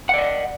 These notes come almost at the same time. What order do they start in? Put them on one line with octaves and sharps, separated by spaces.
F#5 D5 D#5